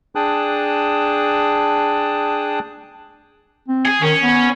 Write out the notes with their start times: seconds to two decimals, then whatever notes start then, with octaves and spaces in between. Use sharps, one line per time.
0.15 D4 G#4 G5 A5 D#6 F#6
3.68 C4
3.85 G#4
4.02 D#3 C#4
4.22 B3